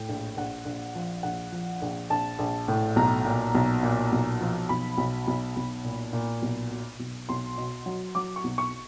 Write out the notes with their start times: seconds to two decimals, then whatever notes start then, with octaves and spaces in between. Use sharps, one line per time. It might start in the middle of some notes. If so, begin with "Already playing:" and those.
Already playing: A2 G5
0.09 A#1
0.37 A#1 F#5
0.65 A#1
0.95 F3
1.23 A#1 F#5
1.52 F3
1.82 A#1
2.10 A#1 A5
2.39 A#1
2.68 A2
2.96 B1 A#5
3.25 A#2
3.55 B1
3.83 A#2
4.12 B1
4.41 F3
4.69 B1 B5
4.98 B1
5.27 B1
5.56 B1
5.84 A#2
6.13 A#2
6.42 B1
6.71 B2
6.99 B1
7.29 B1 C6
7.57 B2
7.86 F#3
8.15 F#3 D6
8.36 C#6
8.44 B1
8.58 C#6